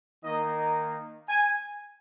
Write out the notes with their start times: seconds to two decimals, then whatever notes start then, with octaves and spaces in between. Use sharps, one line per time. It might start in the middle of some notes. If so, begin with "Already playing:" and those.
0.23 D#3 A#3 D#4 D#5
1.29 G#5